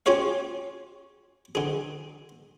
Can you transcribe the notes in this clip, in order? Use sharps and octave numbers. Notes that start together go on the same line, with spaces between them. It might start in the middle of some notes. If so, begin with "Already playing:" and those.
C#4 F4 G4 G#4 C#5 F5
D3 G#4